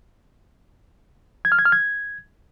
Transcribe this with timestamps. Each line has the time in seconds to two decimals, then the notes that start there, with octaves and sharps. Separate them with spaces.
1.45 G#6
1.52 F6
1.59 G#6
1.65 F6
1.72 G#6